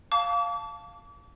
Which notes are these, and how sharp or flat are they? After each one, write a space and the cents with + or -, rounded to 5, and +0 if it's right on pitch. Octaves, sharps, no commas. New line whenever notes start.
F5 +0 A5 +0 D6 -40